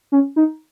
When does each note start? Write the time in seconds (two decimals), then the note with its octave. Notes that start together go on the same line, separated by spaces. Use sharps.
0.12 C#4
0.36 D#4